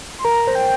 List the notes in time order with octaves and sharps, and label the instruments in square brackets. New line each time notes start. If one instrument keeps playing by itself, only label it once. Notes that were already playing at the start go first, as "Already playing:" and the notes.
[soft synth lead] C6
[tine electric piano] A#4 [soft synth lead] A#5
[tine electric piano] C5
[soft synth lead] G5